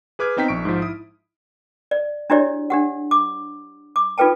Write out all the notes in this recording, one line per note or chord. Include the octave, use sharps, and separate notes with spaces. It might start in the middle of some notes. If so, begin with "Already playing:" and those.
G#4 B4 D6 F6 G#6
B3 C4 D#4 G5 A#5 B6
A#1 C#6 D7
G#2 F3
E4 D#6
D5
D4 E4 F#4 G4 C#5 D5
D4 G4 F#5
D6
D6
D#4 F4 A4 B4 G5 A5